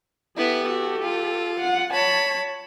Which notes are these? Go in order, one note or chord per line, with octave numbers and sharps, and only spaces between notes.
B3 E4 G4 A4
F#4
F4
F#5
C#5 A5 B5